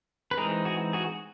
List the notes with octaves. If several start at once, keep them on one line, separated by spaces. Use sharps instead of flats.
B4
E3 G#3 C4 D#4 G#4 A#4
F#4 G#4
F#4 G#4